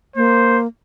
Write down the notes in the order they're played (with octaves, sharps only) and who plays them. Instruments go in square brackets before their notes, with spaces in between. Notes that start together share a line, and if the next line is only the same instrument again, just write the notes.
[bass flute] A#3 [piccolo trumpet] C5